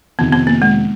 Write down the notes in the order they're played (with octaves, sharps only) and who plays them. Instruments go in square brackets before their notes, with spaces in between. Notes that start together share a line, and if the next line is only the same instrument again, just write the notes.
[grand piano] F2 C3 D#3 [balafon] B3
[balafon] B3
A#3
G#3